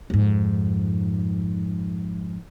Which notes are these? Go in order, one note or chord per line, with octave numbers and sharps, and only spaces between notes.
F2 G#2